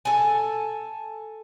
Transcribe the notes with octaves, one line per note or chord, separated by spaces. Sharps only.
A4 G#5